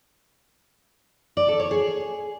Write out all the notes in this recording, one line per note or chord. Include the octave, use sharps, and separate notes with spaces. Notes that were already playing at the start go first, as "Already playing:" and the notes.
D5
A4
C#5
G#4